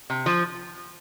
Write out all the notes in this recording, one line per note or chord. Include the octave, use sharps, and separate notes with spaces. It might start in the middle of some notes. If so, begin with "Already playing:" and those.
C3
F3